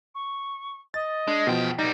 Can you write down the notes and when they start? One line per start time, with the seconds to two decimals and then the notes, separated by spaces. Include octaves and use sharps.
0.15 C#6
0.94 D#5 A6
1.28 G#3 D4
1.47 E2 B2 F3 G5
1.79 B1 G3 D#4 A#6